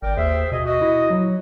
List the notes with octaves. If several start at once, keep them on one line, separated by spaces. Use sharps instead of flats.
G#1 A#4 D5 G5
D#2 G#4 C5 E5
B2 G#4 D#5
F#4 D#5
E4
F#3